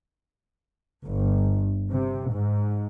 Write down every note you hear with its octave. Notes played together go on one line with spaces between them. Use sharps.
G1
C3
G#2